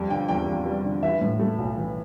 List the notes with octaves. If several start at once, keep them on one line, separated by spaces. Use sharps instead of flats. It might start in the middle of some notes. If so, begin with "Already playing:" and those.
Already playing: F2 G3
D3 G5
E2 G5
E2
G3
D3
E3 E5
A2
A3
B1
E3